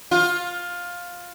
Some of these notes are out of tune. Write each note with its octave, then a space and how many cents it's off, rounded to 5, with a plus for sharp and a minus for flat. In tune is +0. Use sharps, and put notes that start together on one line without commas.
F4 +15